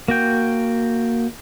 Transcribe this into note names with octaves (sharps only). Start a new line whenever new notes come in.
A#3 F#4 G5